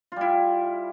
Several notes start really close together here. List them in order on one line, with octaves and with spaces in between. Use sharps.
F4 G3 E4